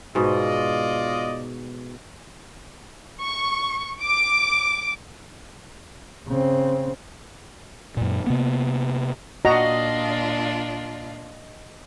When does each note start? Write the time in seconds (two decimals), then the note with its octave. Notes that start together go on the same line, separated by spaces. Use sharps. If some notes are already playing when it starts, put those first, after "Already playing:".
0.15 G#2 B2 F4 D5 D#5
3.22 C#6
4.01 D6
6.28 C#3 C4
7.97 F#2 A#2
8.27 C3 A#3 B3
9.45 A#2 D4 F4 F#4 D#5 A#5